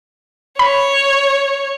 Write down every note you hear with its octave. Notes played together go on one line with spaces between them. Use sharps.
C#5 B5